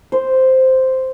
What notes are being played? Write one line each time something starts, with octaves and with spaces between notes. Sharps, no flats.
C5